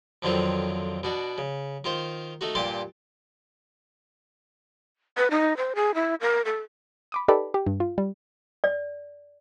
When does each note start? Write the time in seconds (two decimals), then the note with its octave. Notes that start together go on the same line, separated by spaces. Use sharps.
0.22 F2 D3 D#3 F#3 C4 F4
1.03 B2 D4 F#4
1.38 C#3
1.84 D#3 F4 C5
2.41 A3 D#4 F#4
2.55 G2 A#2 G4 A5 C6
5.18 B4
5.31 D#4
5.57 C5
5.75 G#4
5.95 E4
6.21 A#4
6.45 A4
7.12 B5 D6 D#6
7.28 D#4 G4 A4 B4 D5 B5
7.54 G4
7.66 G2
7.80 F4
7.98 G3
8.64 D5